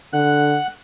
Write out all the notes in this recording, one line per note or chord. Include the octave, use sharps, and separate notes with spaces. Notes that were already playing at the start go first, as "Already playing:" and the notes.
D3 F#5 F#6